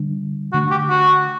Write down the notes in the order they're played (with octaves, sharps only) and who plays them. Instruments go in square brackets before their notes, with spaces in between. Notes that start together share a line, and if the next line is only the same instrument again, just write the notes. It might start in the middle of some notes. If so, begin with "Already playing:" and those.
Already playing: [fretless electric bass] D3 G3 D4
[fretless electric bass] D3 A3 D4 [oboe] F#4
[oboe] G4
F#4